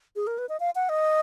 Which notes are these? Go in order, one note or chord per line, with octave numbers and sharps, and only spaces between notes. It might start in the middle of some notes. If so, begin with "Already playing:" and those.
G#4
A#4
B4
D#5
F5
F#5
D#5